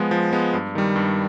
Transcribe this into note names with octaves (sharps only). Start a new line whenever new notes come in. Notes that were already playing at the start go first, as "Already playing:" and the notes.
Already playing: F3 G#3 B3
F3
G#3 B3
G2
D#3 G3
G2